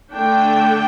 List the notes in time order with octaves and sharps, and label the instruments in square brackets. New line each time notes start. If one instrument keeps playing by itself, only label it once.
[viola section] D3 A3 D4 G5